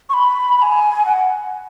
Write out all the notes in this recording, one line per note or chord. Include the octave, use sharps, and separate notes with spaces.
C#6
B5
B5
G#5
F#5